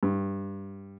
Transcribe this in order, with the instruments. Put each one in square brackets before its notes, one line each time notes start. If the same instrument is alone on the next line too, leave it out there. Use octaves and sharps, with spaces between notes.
[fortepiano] G2